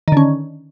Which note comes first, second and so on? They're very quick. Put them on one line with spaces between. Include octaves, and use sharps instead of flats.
D#3 D3 C#4